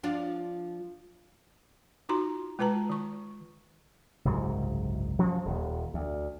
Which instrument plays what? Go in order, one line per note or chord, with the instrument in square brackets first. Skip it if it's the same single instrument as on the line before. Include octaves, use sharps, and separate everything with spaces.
[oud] F3 D4 F4
[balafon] D#4 F4 F#4 A#5 C6
G#3 F4 B4 A5 A#5
D#3 C#6
[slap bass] F#1 C2 G#2 F#3
F3 F#3 C#4
D#1 D#2
D2